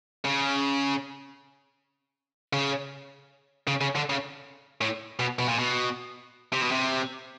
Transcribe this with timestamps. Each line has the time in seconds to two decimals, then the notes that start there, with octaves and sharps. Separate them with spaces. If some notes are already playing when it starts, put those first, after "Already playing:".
0.25 C#3
2.53 C#3
3.68 C#3
3.81 C#3
3.96 D3
4.10 C#3
4.81 A2
5.20 B2
5.39 B2
5.48 A#2
5.59 B2
6.53 C3
6.62 B2
6.71 C3